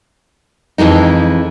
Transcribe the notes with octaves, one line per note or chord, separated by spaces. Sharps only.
F2 E3 G#3 D#4